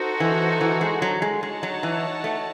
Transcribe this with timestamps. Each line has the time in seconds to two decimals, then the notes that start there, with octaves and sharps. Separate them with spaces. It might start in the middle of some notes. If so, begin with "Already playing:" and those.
Already playing: D#4 F#4 A4 C5
0.20 E3
0.61 E3
0.81 G#3
1.02 F#3
1.22 G#3
1.43 G#3 D#4 F#4 C#5 F#5 A5
1.63 F#3
1.83 E3
2.24 A3